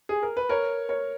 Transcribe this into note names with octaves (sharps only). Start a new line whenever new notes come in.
G#4
A#4
B4
A#4 C#5
A#4 C#5